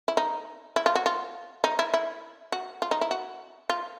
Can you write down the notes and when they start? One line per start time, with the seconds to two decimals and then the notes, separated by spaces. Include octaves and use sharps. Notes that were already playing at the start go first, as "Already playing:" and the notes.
0.08 E4
0.17 D#4
0.76 E4
0.86 F4
0.95 F#4
1.06 F4
1.64 D#4
1.79 E4
1.94 E4
2.52 F#4
2.82 F4
2.91 D#4
3.01 E4
3.11 F#4
3.69 F4